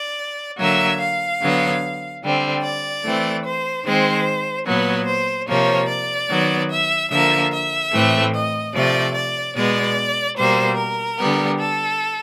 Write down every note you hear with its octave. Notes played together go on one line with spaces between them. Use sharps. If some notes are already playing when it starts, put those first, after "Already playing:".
Already playing: D5
D3 F#3 A#3 E5
F5
D3 F#3 B3
D3 G3 C4
D5
E3 A3 C4
C5
D#3 G#3 C4 C5
A#2 F#3 B3 B4
C5
C3 F3 A#3 C#5
D5
D#3 F#3 B3
E5
D3 F3 A#3 E5
E5
A2 E3 A3 C4
D#5
C3 F3 A3 D5
D5
B2 G#3 B3 D5
B2 G3 A#3 C5
A#4
D3 G3 B3
A4